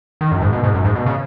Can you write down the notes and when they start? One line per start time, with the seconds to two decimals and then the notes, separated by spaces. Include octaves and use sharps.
0.21 D#3
0.32 F#2
0.42 G#2
0.52 B2
0.63 G#2
0.74 F#2
0.85 G#2
0.95 B2
1.06 C#3